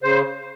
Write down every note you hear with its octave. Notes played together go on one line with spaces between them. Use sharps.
C#3 C5